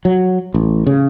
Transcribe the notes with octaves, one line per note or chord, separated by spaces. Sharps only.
F#3
A1
C#3